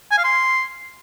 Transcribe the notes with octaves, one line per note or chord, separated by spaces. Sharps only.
G#5
F5
C6